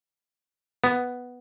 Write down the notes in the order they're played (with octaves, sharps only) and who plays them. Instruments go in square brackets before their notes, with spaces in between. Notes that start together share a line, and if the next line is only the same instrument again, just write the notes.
[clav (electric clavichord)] B3